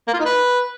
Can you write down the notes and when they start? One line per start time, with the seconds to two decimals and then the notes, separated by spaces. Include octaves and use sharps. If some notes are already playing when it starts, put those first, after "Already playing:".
0.08 A#3
0.14 F4
0.19 D#4
0.25 B4